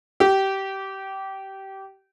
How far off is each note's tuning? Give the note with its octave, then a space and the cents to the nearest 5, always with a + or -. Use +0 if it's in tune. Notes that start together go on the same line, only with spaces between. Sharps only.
G4 -20